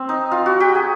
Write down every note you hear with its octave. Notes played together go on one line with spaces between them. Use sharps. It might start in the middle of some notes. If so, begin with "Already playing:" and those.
Already playing: C4
D#4
F4
F#4
G4
G#4